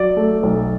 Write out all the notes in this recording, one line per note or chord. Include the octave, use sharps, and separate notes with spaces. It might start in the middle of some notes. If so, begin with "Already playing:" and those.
Already playing: F#3 D5
A3
B1